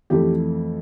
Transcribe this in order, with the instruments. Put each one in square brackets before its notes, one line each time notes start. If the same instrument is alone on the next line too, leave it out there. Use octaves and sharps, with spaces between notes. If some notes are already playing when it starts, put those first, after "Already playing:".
[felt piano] F2 E3 A3 G4